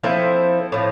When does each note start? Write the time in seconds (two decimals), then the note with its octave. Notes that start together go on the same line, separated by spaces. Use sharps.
0.03 F3 C4 E4 A4
0.72 A2 F3